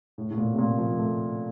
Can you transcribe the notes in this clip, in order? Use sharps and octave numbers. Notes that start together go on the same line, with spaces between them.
A2
A2
A#2
C3
A#2
F3
A3